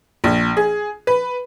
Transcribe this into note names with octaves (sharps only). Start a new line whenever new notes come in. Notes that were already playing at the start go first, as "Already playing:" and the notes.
A#1
G#4
B4